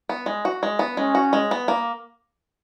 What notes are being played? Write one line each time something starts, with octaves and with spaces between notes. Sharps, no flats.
B3
G#3
F#4
G#3
B3
G#3 C#4
F#4
G#3
B3
A#3